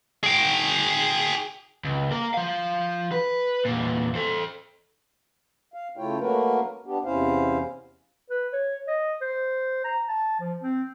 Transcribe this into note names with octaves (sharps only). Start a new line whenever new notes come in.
G#4 G5
C#2
A#3 A#4
F3 F5
B4
E2 A#2
A4 C5
F5
C#3 A3 E4 F4 C#5 G5
F#3 A3 A#3 F#4 A#4 B4
B3 D4 G4
E2 C3 C#4 E4 C5 F5
B4
C#5
D#5
C5
A#5
A5
F3
C4